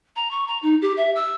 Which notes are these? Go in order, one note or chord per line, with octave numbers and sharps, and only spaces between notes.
A#5
C#6
A#5
D#4
G4
E5
E6